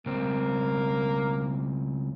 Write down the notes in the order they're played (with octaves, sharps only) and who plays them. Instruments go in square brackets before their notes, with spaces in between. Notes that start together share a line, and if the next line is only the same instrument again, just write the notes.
[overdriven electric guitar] C#2 C4 [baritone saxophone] A#3